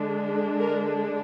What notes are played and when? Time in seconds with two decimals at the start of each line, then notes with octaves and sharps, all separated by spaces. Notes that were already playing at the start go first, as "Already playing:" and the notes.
Already playing: D3 G#3 D4
0.59 A#4